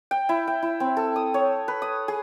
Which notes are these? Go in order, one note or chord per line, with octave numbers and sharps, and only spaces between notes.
G5
E4
G5
E4
C4
A4
D#6
C#5
B4
D#6
G#4